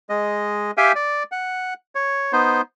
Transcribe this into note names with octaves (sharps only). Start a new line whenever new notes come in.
G#3 D#5
G4 E5 F5 G5 G#5
D5
F#5
C#5
B3 D#4 C5